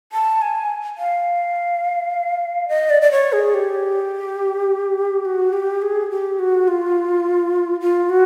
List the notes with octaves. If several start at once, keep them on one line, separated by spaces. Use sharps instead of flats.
A5
G#5
F5
D#5
D5
D5
C#5
G#4
G4
F#4
G4
G#4
G4
F#4
F4
F4
F#4